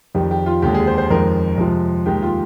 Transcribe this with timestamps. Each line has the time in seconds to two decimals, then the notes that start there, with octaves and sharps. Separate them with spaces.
0.14 F2 D#3 G3 G4
0.31 G4
0.46 F4
0.62 D#2 D3 G#3 G4
0.74 G#4
0.87 C5
0.98 C5
1.10 F2 D#3 G#3 A#4
1.58 F2 C3 F3 G#3
2.06 D#2 D#3 G#3 G4
2.22 F4